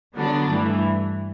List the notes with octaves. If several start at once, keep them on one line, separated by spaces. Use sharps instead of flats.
D3 F#3 B3 D4
G2 E3 A3